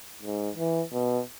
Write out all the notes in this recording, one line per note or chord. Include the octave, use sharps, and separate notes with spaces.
G#2
E3
B2